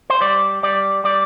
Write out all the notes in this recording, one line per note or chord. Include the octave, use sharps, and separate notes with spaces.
C5
G3 D5
G3 D5
G3 D5